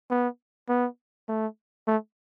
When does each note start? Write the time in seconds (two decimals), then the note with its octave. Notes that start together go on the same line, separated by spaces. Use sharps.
0.10 B3
0.69 B3
1.29 A3
1.87 A3